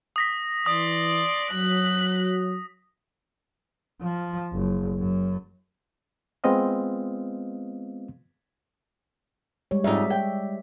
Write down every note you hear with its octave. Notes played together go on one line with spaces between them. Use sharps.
D#6 A#6 B6
E3 D5 C6 D#6
F#3 F#6 B6
F3
F#1
F#2
G#3 B3 C4 F4 D#5 F5
G3 G#3 C#5
F2 G#2 D#4 D5 E5
G5